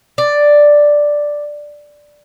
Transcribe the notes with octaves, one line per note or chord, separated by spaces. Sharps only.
D5